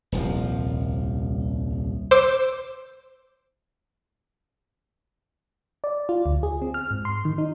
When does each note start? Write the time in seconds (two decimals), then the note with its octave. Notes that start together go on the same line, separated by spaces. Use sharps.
0.12 D#1 C2 F3
2.11 C5 D6 E6 C7
5.84 D5
6.09 F4
6.26 D2
6.43 G#4
6.62 C4
6.74 F6
6.91 G#2
7.05 C6
7.25 D#3
7.38 D#4